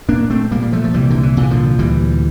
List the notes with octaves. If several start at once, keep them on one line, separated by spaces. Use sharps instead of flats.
A#2 A#3 D4
A3 C4
A#2 G3 A#3
G3
F3 A3
F3
C2 E3 G3
D3
E3
A#2
E3
D3 F3
D2 E3 G3